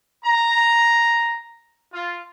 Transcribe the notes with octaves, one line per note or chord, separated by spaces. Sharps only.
A#5
F4